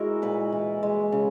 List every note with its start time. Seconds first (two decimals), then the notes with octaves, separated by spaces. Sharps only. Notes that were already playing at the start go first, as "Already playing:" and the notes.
Already playing: G#3 E4 F#4 G#4 A#4
0.22 A#2 B4
0.52 E3
0.83 G#3
1.12 C#3